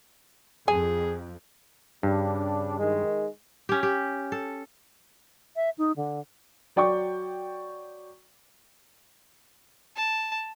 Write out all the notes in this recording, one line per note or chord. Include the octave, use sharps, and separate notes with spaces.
F2 G#4 G#5
G2 C#3 G3 D4
D#3 G#3
C#4 G4
G4
A4
E5
D#4
D3
F#3 D5 G5 C#6
A5